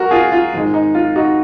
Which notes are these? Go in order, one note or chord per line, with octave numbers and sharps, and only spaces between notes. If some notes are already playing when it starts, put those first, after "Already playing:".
Already playing: G#3 F#4 A#4
F4 G#4
F4
G#2 D#3 G#3
D#4
F4
D#4 F#4